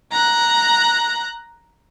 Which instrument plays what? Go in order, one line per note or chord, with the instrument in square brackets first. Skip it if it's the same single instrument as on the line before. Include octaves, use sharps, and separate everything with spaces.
[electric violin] A#5 F#6